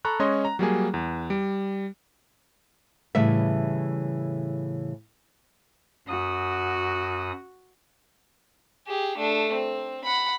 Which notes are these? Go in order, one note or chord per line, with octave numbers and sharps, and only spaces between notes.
A4 A#5 B5 C#6 F#6
G#3 C#4 C#5 D#5 C6
A#5
F#3 G3 A#3 G#4
E2
G3 D7
A2 C#3 E3 G3 E5
F#2 F#4 D#6
G4 G#4
A3 D4
C4
F#5 B5